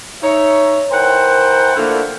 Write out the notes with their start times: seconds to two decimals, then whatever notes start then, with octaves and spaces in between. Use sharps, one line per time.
0.22 D#4 C#5 E5
0.91 E3 A#4 C5 F#5 G5
1.76 D3 F3 A3 A#3 D4 E4